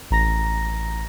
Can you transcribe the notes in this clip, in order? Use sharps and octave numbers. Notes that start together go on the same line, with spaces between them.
A1 A#5 A#6